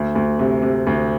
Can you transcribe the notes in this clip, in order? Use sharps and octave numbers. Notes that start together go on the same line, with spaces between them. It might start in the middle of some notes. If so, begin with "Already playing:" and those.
Already playing: D2
D2
C3
C3
D2